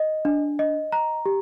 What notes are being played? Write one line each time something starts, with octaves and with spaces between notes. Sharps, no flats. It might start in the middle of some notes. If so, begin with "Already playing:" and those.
Already playing: D#5
D4
D#5
A#5
G4